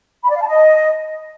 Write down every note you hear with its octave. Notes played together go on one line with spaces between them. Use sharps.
B5
D5
F5
A5
D#5